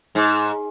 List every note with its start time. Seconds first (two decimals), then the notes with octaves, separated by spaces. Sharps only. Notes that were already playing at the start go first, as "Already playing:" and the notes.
0.15 G#2